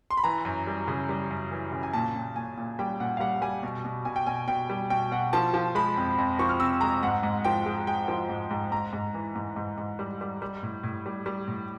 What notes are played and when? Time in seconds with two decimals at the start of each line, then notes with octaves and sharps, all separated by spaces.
0.10 C6
0.17 B5
0.24 E3 A#5
0.45 F#2
0.67 G3
0.88 C#3
1.09 G3
1.31 F#2
1.52 E3
1.72 C#3
1.83 G#5
1.93 A#2 A5
2.15 A#2
2.36 A#2 G#5
2.57 A#2
2.79 G3 G5
3.00 A#2 F#5
3.17 F5
3.20 G3 F#5
3.42 G3 G#5
3.63 B2
3.85 B2
4.05 B2 G#5
4.16 G5
4.26 B2 G#5
4.48 B2 G5
4.69 G3
4.90 B2 G5
5.11 B2 F#5
5.33 F3 A5
5.54 F3
5.75 G#3 B5
5.97 F2
6.18 F2
6.39 F3 C#6
6.49 F6
6.60 C3 E6
6.81 G#3 A#5
7.03 G#2 F#5
7.23 G#2
7.44 F3 G5
7.66 G#3
7.87 G#3 G5
8.08 F3
8.29 G#2
8.51 G#2
8.72 G#2 A#5
8.93 G#2
9.14 E3
9.36 G#2
9.56 G#2
9.78 G#2
9.99 G3
10.21 G3
10.42 G3
10.63 A2
10.83 A2
11.06 G3
11.26 G3
11.48 A2